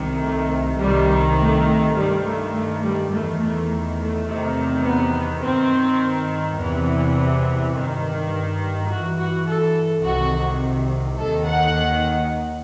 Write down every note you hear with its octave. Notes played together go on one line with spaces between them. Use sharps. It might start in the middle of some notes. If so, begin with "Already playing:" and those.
Already playing: C2 C3 D#3
A3
C2 C3 D#3 G3
A3
G2 D#3 G3
A3
A3
G3
E2 D#3 A3
A3
A3
E2 C3 D#3
B3
G2 D#3 C4
E2 C3 E3
G2 D#3
G2 E3 F#4
F#4
A4
C2 C3 D#3 F#4
D#2 D#3 A4
F#5